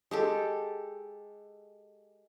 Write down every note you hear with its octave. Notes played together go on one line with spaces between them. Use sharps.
G#3 G4 A4